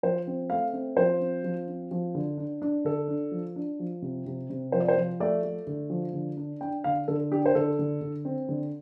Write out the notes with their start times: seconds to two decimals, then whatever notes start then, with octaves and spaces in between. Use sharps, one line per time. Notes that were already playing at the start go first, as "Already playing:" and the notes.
0.03 F3 C5
0.27 C4
0.50 A3 F5
0.73 C4
0.97 F3 C5
1.20 C4
1.44 F3
1.68 C4
1.91 F3
2.15 D3
2.38 D4
2.62 D4
2.85 D3 A4
3.08 D4
3.32 F3
3.56 D4
3.80 F3
4.02 C3
4.26 C3
4.50 C3
4.72 F3 C5
4.81 D5
4.88 C5
4.96 F3
5.20 A3 D5
5.44 A3
5.67 D3
5.90 F3
6.13 D3
6.37 D4
6.61 D4 G5
6.84 D3 F5
7.08 D3 A4
7.31 D4 G4
7.46 C5
7.55 D3 A4
7.79 D3
8.01 D3
8.25 C4
8.49 D3